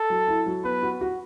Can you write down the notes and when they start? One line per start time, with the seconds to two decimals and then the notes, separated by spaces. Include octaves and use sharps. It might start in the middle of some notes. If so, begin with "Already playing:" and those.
Already playing: A4
0.10 F#3
0.28 E4
0.46 F#3
0.64 B3 B4
0.83 F#4
1.01 F#4